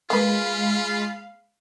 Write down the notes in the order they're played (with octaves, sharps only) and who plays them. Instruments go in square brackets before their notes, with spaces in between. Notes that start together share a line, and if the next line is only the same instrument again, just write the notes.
[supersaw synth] G#3 B5 C7 [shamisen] A#3 B4 [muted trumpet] F4 [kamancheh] F5